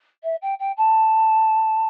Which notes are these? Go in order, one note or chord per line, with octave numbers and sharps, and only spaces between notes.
E5
G5
G5
A5